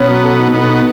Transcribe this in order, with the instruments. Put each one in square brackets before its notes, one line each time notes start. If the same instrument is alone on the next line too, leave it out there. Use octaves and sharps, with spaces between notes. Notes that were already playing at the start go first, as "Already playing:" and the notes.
Already playing: [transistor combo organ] B2 B3 [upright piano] C#4
[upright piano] F#3
A4
D#4
[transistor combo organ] B2 B3 [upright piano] D#4
[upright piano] D#4